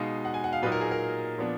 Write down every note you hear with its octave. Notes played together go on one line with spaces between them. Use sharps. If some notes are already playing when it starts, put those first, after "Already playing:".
Already playing: B2 G#3 D#4 F5
F#5
G#5
F#5
F5
A#2 F#3 A#3 D#4 B4
A#4
G#4
A#4
A#2 F3 B3 D4